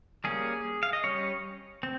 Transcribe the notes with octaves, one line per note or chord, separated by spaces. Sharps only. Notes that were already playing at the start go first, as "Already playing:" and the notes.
G3 A#3 C#4 G#4
F5
D#5
G3 C#4 C#5
C4